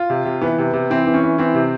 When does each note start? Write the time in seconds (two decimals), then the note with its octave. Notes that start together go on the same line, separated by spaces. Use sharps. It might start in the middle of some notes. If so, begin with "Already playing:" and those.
Already playing: F4
0.10 C3
0.25 C3
0.41 E3 B3
0.58 C3
0.73 C3
0.90 E3 C4
1.06 E3
1.14 C#4
1.23 E3
1.38 E3 C4
1.54 C3